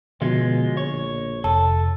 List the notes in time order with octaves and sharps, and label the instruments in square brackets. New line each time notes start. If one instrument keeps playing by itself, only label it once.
[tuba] B2 [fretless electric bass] D3 F3 [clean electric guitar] G#3 F4
[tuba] A#1 [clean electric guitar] C#5
[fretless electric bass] F1 [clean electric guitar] A4 [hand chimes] A5